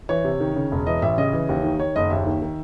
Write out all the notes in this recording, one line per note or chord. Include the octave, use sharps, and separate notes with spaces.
E3 C#5
C3
D#3
C#3
E1
E3 D#5
A1 E5
C#3 D#5
E3
D#2
D#3
D#3 C#5
F#1 D#5
D#2 E5
D#3
D#3